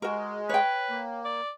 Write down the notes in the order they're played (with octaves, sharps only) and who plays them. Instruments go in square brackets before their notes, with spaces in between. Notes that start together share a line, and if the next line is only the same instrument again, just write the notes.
[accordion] G#3 [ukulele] F#4 A#4
[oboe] B4 [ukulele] C#5 G5
[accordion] A#3
[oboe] D5